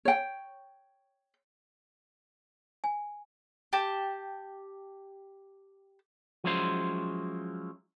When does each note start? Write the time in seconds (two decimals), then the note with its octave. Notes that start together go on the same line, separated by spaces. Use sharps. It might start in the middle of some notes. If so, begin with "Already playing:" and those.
0.05 C#5 G5
2.84 G#5
3.73 G4 A5
6.44 F3 F#3 G#3 C#4 E4 C5